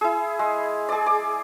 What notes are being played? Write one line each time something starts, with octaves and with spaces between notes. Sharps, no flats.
E4 G#4
G#3
G#4 D5
D6